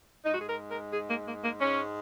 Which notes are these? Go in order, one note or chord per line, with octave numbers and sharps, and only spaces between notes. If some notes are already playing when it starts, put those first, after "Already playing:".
G#2 G#3 D#4
F#4
G#4
A#4
A#4
G#4
A#3
A#3
A#3
G#2 G#3 C#4